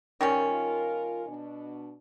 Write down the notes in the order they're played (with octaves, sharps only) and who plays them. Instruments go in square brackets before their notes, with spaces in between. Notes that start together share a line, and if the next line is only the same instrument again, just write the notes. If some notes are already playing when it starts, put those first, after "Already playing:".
[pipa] D#3 G3 C#4 [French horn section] F4 A#4
[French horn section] B2 D4